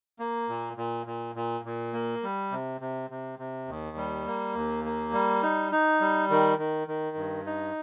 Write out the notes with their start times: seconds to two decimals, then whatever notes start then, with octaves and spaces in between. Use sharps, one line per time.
0.19 A#3
0.49 A#2
0.77 A#2
1.06 A#2
1.35 A#2
1.65 A#2
1.93 A#3
2.23 G3
2.51 C3
2.81 C3
3.10 C3
3.39 C3
3.68 D#2
3.97 G3
4.27 A#3
4.55 D#2
4.85 A#3
5.13 G3
5.43 D#4
5.72 D#4
6.01 G3
6.30 D#3
6.59 D#3
6.88 D#3
7.16 G2
7.46 D#4